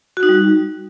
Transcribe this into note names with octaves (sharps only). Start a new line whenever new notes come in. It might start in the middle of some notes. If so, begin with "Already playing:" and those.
F#4
D#4
G3